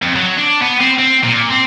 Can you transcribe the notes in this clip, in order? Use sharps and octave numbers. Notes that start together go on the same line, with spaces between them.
F2
F#3
D4
B3
C4
C4
A#2
C4